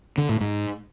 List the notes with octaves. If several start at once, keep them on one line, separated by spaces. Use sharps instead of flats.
D3
A2
G#2